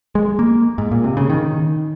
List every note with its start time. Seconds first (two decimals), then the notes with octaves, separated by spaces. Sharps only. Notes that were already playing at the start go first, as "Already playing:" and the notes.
0.15 G#3
0.39 A#3
0.78 G#2
0.91 A#2
1.04 C3
1.17 C#3
1.30 D#3